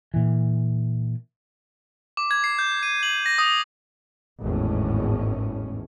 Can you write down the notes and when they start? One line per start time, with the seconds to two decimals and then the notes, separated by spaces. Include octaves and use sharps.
0.14 A#2 E3
2.17 D6
2.31 G#6
2.44 C7
2.59 G6
2.83 D#7
3.03 F#7
3.26 A#6
3.38 D#6
4.41 G#1 E2 A2 C#4